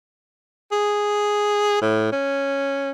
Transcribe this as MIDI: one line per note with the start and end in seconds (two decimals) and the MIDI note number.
0.72 1.78 68
1.82 2.12 45
2.12 2.91 61